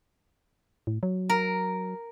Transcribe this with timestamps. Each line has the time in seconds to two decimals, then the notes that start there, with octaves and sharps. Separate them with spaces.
0.87 A2
1.03 F#3
1.29 A#4